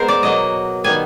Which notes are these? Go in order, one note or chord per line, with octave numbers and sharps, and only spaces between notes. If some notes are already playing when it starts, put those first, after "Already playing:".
Already playing: G#3 B3 A#4 C5
D5
B2 F#3 A#3 D#5
D#3 G3 B3 G#5